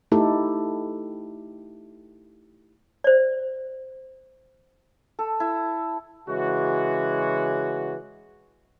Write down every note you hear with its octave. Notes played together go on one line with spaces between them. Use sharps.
A3 D#4 E4 G4 A4
C5 D5
A4
E4
C#3 E3 G#3 F#4